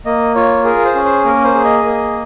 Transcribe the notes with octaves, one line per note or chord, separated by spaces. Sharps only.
A#3 D#5
F4 C#5
G#4 A#4
C5
C#4
C5
A#3 A#4
C5
G#4
D#5
A#3